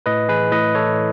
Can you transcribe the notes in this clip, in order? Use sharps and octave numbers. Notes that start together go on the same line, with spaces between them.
A2 B4 D#5
E3 G#4 B4
A2 B4 D#5
E3 A4 C#5